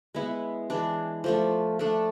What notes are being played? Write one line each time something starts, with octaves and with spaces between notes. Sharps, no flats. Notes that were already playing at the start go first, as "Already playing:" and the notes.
G#3 B3 E4
E3 G#3 D4
F3 A3 D4
A3 D4 A4